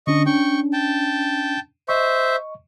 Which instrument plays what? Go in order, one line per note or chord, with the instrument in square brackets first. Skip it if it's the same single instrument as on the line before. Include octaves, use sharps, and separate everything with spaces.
[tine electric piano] D3 C#4 D4 [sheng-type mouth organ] D#5 C#6
[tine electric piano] C#4 D4 [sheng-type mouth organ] G5 C#6
[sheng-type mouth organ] G5 A5
[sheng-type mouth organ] C5 E5 [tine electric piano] D#5 C#6